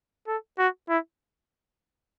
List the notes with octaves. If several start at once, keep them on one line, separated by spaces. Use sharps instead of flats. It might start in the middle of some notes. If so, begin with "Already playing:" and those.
A4
F#4
E4